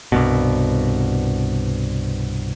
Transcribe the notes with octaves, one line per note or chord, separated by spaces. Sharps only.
C2 G2 B2